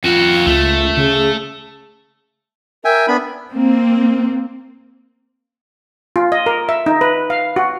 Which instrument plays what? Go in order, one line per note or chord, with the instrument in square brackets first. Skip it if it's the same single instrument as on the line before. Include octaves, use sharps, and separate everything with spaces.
[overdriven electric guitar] F2 F#4 [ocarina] F4
[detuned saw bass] C#2 [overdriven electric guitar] A3
[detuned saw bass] C#3 [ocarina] G#4
[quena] A#4 [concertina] E5 G5 G#5
[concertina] B3 D4 B5
[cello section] A#3 C4
[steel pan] F4
D#5
A#4
E5
D#4
B4
F5
F#4